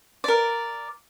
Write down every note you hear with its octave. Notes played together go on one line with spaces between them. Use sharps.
A#4 D5